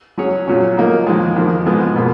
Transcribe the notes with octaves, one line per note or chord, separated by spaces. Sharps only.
F#3 C#4 G#4 C#5
A#2 F#3 C#4
F3 A#3 D#4
F2 D#3 G#3
F2 D#3 A#3
G#2 F3 G#3 B3
B2 A#3